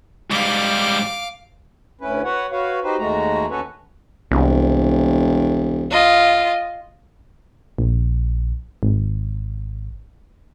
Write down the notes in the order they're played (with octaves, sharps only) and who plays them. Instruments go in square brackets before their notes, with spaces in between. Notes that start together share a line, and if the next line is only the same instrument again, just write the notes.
[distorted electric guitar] G#2 G3 [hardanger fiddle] F5 D6
[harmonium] D2 C#4 E4 B4
F#4 B4 C#5 F#5
F#4 B4 C#5 F5
D#4 F#4 G4 B4 C5
D#2 G#3 A3 F#4 A#5
D#2 C#4 F#4 A4 B4 C#5
[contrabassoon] E1 [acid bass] C2
[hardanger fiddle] F4 D#5
[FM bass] A#1
G#1